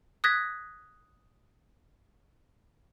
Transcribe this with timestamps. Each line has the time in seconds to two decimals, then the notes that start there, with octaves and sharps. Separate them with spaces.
0.24 D#6 F#6 G#6 A#6 B6